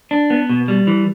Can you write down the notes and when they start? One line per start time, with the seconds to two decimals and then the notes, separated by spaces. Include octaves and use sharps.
0.11 D4
0.30 B3
0.49 B2
0.68 G3
0.87 E3